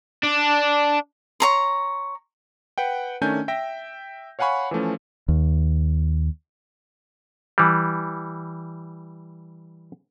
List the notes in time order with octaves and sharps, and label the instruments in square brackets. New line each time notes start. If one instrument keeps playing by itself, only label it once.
[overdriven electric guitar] D4
[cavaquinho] C#5 A#5 C6
[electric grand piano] B4 F#5 G5
D#3 A3 C#4 D4 G#5 G6
E5 G5 A#6
C#5 F5 F#5 G#5 B5 C#6
E3 F3 A3 C#4
[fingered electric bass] D#2
[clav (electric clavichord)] E3 G3